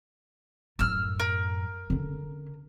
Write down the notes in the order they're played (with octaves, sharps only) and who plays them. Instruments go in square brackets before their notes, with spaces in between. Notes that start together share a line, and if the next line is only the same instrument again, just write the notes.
[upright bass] F#2 A2 [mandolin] E6 F6
[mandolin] A#4
[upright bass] D3 C#4